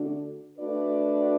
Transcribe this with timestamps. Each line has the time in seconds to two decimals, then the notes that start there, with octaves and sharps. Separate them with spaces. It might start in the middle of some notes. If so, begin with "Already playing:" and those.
Already playing: D3 A3 D4 F#4
0.59 A3 D4 F#4 B4 D5